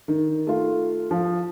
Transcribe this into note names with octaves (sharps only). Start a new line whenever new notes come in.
D#3
A3 F4
F3